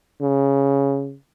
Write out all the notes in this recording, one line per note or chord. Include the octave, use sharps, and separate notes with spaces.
C#3